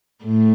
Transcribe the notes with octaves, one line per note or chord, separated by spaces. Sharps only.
A2